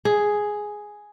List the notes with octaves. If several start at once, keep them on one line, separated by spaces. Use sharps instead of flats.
G#4